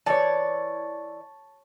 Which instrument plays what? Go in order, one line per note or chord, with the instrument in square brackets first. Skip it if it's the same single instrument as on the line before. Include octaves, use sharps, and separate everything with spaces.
[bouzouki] E3 D5 [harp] C#5 A5